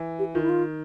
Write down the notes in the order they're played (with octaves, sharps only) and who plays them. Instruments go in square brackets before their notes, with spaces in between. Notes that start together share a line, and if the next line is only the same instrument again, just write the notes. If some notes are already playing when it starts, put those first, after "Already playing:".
Already playing: [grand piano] E3
[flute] G4
[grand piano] D#3 [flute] F4
[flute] E4
F4